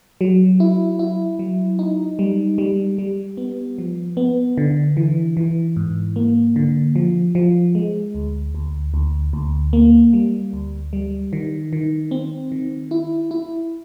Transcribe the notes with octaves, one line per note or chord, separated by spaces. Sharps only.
F#3
E4
E4
F#3
D#4
G3
G3
G3
B3
F3
B3
D3
E3
E3
G#2
A#3
D3
F3
F3
G#3
D2
D2
D2
D2
A#3
G3
D2
G3
D#3
D#3
C4
D#3
E4
E4